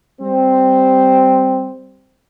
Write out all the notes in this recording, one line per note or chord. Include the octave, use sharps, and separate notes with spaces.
G3 C4